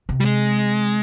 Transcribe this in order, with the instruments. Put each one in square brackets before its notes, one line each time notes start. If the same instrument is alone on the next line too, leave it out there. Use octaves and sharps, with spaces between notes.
[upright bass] C3
[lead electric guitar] G3
G#3